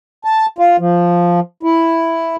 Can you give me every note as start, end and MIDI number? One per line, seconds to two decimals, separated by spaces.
0.25 0.46 81
0.59 0.76 65
0.79 1.40 53
1.63 2.36 64